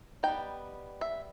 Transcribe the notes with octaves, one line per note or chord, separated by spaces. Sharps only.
G3 B3 D#4 G5
E5